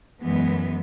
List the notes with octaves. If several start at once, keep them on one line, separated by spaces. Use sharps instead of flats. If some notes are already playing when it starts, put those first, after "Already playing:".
F#2 E3 G#3 B3